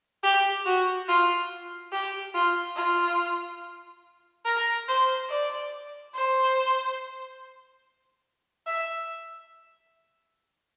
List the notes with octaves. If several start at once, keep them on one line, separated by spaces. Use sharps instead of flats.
G4
F#4
F4
G4
F4
F4
A#4
C5
D5
C5
E5